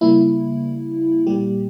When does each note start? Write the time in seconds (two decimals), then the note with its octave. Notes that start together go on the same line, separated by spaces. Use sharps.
0.01 C#3 G3 A#3 E4
1.27 A#2 G3 A#3 G4